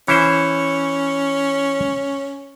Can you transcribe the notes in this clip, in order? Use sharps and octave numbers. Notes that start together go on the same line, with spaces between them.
E3 C#4 E4 C5